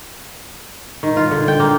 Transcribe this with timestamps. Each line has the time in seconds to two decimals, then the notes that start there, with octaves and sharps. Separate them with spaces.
1.03 D#3
1.17 F4
1.31 D3
1.48 G5
1.60 A#3